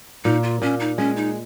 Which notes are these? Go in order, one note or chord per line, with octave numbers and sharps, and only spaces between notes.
A#2 D#4
F4
A#2 C#4
D#4
G#3 C#4
D#4